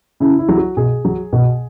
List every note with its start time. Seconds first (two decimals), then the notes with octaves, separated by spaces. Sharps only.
0.20 C#3 E4
0.39 E4
0.49 F#3
0.57 F#4
0.77 B2 G#4
1.05 F#3
1.33 B2